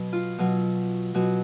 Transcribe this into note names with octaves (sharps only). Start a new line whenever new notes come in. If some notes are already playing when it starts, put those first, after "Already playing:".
Already playing: B2 F#3
F4
B2 F#3
B2 F#3 F#4